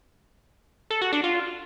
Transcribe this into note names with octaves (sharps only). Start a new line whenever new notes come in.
A4
F#4
D4
F4